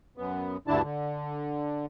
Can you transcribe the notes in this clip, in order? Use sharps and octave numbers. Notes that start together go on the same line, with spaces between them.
F#2 B3
D2 G2 D3 D4 E4 A5
D3